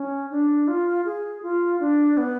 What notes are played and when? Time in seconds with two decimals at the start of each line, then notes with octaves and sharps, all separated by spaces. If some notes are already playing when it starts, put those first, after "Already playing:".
Already playing: C#4
0.31 D4
0.68 F4
1.05 G#4
1.43 F4
1.80 D4
2.17 B3